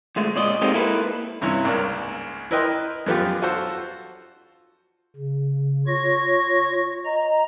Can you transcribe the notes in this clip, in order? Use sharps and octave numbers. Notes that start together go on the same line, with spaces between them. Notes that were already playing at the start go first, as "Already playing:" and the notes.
D2 G#3 A3
C#2 A#2 D5 D#5
G#3 C4 D#4 F4 G4 A4
A#3 E4 A4 B4
G2 C3 C#4 E4
G#1 C#2 A#3 D5
E4 A#4 B4 D#5 G5 C6
F#2 F3 B3 F4 G4
F4 F#4 A4 C5
C#3
F4 C#5 C#6 A#6
D#5 A#5